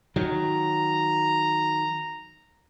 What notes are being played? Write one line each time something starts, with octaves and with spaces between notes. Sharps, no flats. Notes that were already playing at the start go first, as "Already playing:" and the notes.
D#3 F#3 A#5